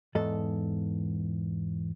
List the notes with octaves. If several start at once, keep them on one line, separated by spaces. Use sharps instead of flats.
E2 G#2 A4 D#5